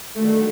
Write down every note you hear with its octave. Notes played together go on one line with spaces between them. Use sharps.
D#3 G3 A3 A#3 D4 F#4